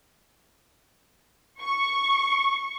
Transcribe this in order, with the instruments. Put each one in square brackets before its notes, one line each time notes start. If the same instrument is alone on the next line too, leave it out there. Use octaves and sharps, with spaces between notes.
[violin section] C#6